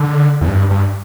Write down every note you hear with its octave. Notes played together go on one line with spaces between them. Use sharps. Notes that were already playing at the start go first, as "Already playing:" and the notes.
Already playing: D3
E2
G2
G2